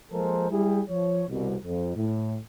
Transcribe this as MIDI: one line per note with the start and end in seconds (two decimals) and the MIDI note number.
0.12 0.49 53
0.12 0.49 56
0.12 0.49 58
0.12 0.49 69
0.12 0.49 70
0.12 0.49 72
0.50 0.81 55
0.50 0.81 64
0.50 0.81 67
0.50 0.81 68
0.88 1.23 53
0.88 1.23 73
1.28 1.55 36
1.28 1.55 47
1.64 1.92 41
1.95 2.37 45